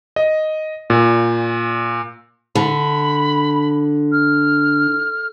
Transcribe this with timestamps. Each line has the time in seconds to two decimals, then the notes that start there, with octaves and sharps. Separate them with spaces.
0.16 D#5
0.90 A#2
2.55 D3 B5
4.12 F6